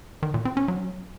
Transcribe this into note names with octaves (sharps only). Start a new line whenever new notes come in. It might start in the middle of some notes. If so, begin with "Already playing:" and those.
D#3
A#2
C4
C#4
F#3